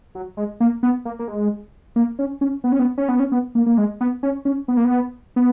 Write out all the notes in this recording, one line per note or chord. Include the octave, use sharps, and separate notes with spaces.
F#3
G#3
A#3
B3
A#3
A#3
G#3
A#3
C#4
C#4
B3
C#4
B3
C#4
B3
C#4
B3
A#3
A#3
G#3
B3
C#4
C#4
B3
A#3
B3
B3